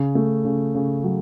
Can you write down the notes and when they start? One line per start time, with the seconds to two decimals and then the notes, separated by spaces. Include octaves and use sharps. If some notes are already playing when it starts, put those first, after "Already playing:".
Already playing: C#3
0.15 A3
0.45 C#3
0.75 C#3
1.04 F#3